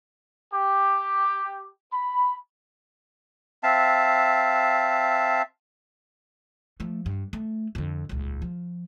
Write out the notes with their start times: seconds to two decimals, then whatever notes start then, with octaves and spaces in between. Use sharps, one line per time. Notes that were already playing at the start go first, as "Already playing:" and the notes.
0.53 G4
1.93 B5
3.63 C4 E5 F5 A5
6.80 F3 A3
7.06 G2
7.33 A3
7.75 F2 D3
8.09 D#1 C#2
8.42 F3